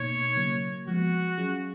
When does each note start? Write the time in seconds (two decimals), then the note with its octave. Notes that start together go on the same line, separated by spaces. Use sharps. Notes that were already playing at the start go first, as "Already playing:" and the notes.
Already playing: B2 A#3 D#4 C#5
0.35 C#3 F#3 A#3
0.87 F3 G#3 B3 F#4
1.38 F#3 C#4 F4 G#4